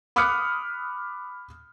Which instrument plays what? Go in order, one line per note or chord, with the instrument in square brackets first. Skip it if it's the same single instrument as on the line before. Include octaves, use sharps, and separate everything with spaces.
[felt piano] B5 D6 D#6 F6 F#6 C#7